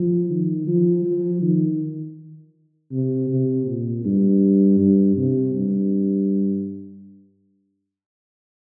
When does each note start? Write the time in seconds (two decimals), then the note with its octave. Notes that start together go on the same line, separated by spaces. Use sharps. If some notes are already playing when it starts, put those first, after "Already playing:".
Already playing: F3
0.29 D#3
0.67 F3
1.05 F3
1.42 D#3
2.92 C3
3.30 C3
3.67 A#2
4.05 G2
4.80 G2
5.17 C3
5.54 G2